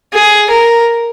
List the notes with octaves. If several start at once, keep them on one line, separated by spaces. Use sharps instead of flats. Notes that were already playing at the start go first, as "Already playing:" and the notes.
G#4
A#4